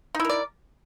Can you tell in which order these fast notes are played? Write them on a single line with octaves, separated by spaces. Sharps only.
D#4 E4 A#4 D5